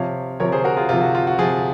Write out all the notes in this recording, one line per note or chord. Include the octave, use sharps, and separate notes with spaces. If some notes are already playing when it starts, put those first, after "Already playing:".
Already playing: C3 F3 C#5 F5
C3 F3 A#4 C#5
G#4 C5
F#4 A#4
F4 G#4
C3 F3 F4
F#4
F4
F#4
C3 F3 F4 G#4